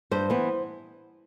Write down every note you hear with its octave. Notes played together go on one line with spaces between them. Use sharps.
G2 C5
E3 B3